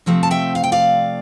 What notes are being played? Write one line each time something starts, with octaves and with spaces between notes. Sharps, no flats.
C3 F3 A3 C4
A5
E5 G5
F5
G5
D5 F5